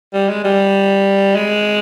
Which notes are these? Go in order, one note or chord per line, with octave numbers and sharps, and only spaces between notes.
G3
G#3
G3
G#3